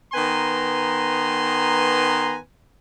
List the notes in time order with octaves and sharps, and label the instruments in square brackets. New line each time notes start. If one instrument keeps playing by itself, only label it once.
[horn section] D#3 B3 B4 G#5 A#5 C6